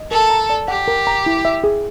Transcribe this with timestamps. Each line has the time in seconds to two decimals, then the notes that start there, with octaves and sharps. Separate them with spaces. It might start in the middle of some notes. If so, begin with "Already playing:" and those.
Already playing: D#5
0.11 A4 A#4
0.30 A#5
0.50 D5
0.68 G4 F#5
0.88 A#4
1.07 A#5
1.26 E4
1.45 E5
1.64 G#4